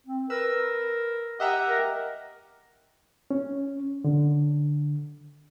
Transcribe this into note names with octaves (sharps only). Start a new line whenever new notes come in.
C4
A#4 B4 E6
G4 D#5 E5 F#5 A#5
A#4
C#4
D3